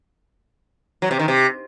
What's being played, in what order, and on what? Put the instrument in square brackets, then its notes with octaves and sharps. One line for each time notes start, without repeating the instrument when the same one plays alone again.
[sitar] F#3
C3
D#3
C3